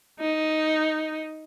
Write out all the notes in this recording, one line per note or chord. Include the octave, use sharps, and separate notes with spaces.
D#4